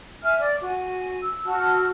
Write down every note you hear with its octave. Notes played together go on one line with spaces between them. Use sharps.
E5 G#5 F6
D5
F#4 G#5
E6
F#4 A5 E6 F6